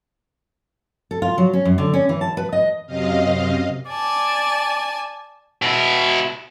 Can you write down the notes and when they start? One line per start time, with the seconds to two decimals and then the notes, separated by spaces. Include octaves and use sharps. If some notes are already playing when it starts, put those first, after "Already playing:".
1.11 A4
1.22 F4
1.38 F#3
1.53 C#4
1.65 F#2
1.78 D3
1.94 C#4
2.09 E3
2.21 A5
2.37 B4
2.53 D#5
2.87 F#2 C3 D#5 F5
3.90 D5 G#5 A5
5.62 B2 E4